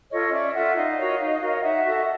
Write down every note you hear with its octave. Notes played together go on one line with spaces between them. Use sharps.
F4 A4 C#5 D#5
C#4 D5 E5
F4 A4 E5 F#5
D#4 D#5 F5
F#4 A#4 C#5
D#4
F#4 A#4 C#5
D#4 E5 F#5
F#4 A4
D#5